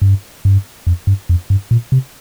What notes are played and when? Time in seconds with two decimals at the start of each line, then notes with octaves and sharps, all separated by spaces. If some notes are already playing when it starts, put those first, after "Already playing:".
0.02 G2
0.45 G2
0.87 F2
1.07 G2
1.29 F2
1.50 G2
1.71 A#2
1.92 C3